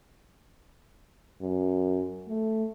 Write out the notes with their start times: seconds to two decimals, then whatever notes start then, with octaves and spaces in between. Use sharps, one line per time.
1.42 F#2
2.29 A3